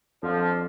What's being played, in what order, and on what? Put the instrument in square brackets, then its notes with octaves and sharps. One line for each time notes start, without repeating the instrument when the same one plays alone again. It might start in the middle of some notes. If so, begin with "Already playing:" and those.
[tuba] F2 [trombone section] D3 F3